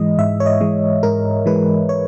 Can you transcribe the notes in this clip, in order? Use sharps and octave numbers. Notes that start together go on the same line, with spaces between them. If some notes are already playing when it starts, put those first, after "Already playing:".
Already playing: G#2 E3 G#3 D#5
G#2 E5
C#5
D#5
E3 G#3
G#2 A#4
E3 G#3 B4
C#5